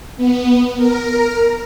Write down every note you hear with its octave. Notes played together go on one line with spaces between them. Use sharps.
B3
A#4